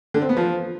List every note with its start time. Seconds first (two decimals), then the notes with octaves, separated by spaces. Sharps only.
0.14 D3
0.22 C4
0.29 B3
0.37 F3